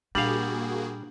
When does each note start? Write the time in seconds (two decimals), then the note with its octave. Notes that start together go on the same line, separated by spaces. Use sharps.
0.15 A#2 G3 A#3 D4 F#4 G#4 F5 F#7